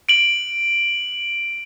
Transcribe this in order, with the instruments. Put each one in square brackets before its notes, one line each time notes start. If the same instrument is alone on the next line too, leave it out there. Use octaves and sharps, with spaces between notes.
[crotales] D7 F#7